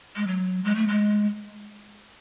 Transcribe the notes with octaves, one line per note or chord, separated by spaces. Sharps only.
G#3
F#3
G#3
A3
G#3